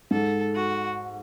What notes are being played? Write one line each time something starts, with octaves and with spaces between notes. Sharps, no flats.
G#2 A4
F#4